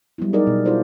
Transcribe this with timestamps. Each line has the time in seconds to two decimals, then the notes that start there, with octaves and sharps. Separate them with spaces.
0.18 F#3 G3 A#3 B3 E4
0.33 G3 D#4 G4 G#4 A#4 D5
0.47 B2
0.65 E4 F4 G#4 A4 C5 D5